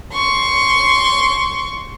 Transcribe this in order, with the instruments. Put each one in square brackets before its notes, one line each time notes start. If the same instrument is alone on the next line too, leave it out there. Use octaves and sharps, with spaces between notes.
[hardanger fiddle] C6 C#6